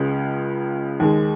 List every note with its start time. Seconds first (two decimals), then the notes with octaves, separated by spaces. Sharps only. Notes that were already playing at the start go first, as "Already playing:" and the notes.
Already playing: C#2 C#3 G#3
1.00 D#2 D#3 G#3